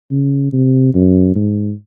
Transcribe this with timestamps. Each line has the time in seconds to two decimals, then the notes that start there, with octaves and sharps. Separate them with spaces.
0.11 C#3
0.53 C3
0.94 F#2
1.35 G#2